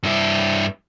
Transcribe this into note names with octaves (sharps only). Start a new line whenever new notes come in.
G2 E4